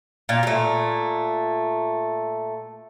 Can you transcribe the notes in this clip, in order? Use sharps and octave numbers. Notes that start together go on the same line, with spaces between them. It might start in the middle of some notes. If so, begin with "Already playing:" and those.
A#2 F5
A#2 A3